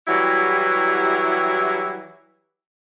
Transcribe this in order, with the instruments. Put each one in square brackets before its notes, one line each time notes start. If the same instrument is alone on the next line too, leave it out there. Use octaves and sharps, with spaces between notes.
[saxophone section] E3 F#3 G3 E4 F#4 G4